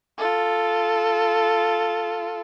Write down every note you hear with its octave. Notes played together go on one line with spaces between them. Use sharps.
F4 A4